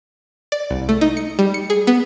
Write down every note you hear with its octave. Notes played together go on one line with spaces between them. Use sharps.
D5
C2
A3
D#4
C#7
G3
C#7
G#4
B3